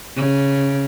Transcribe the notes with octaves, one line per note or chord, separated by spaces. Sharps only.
C#3